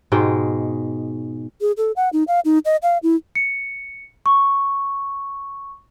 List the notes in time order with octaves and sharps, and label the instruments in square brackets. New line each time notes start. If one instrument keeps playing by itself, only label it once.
[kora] G#2 B2 G#3 G5
[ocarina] G#4
A4
F#5
D#4
F5
D#4
D#5
F5
E4
[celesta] C#7
C#6